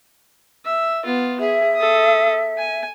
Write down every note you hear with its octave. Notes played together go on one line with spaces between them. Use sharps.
E5
B3 F4
G#4 E5
A4 D#6
G#5